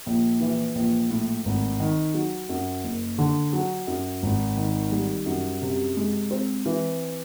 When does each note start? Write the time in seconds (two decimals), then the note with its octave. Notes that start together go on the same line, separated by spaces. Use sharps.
0.06 A#1
0.40 E3
0.75 A#1
1.10 A2
1.45 G#1
1.80 D#3
2.14 F#3
2.49 F#2
2.84 F#1
3.18 D3
3.53 F#3
3.87 F#2
4.23 G#1
4.57 D#3
4.92 G3
5.26 F#2
5.62 C3
5.97 G#3
6.31 C4
6.66 E3